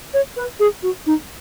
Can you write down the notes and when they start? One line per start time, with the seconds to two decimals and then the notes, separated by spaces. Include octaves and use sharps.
0.14 C#5
0.37 B4
0.59 G#4
0.83 F#4
1.06 D#4